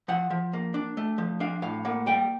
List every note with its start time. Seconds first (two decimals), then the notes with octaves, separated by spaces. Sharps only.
0.08 F3 F#5
0.30 F3
0.53 A#3
0.74 D4
0.97 A3
1.18 F3
1.40 D4 F5
1.62 A2 F5
1.85 A#3 F#5
2.06 G3 G5